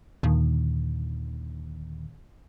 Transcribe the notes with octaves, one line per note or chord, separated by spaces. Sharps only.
D#2 A#2 D3 D#3